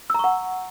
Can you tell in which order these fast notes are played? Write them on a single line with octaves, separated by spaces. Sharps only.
E6 A#5 C#6 F#5